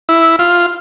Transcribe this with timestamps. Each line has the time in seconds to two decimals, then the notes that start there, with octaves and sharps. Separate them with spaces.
0.09 E4
0.39 F4